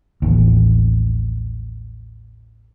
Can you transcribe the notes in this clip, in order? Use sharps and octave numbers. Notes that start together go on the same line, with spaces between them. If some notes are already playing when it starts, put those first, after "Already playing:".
A1 D#2